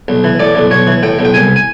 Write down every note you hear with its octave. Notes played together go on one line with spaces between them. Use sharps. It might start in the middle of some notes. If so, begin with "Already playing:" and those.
B1
E3
A2 D5
B1
B1 C#5
E3
A2 G5
B1
G5
C2 G#5
G#5